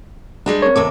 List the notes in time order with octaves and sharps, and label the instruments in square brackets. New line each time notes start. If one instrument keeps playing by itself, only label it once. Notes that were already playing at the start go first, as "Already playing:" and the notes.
[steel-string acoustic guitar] G3 G#3 D4
[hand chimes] C4 A#4 [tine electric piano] C#5
[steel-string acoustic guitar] D#2 C3 A4 [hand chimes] D6